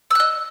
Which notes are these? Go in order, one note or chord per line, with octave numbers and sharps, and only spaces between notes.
D#5 E6 F#6